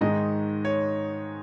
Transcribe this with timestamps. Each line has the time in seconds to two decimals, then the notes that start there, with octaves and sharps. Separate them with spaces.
0.01 G#2 D#3 G#3 D#5
0.65 C#5